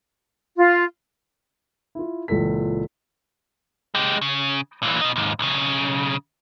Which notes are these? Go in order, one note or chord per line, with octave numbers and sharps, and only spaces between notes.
F4
E4 F4
C#2 A#2 E3 A4 B6
G#3 G4
C#3
A#2 E3
B2 D#4
D#2 G#2
B1 C#3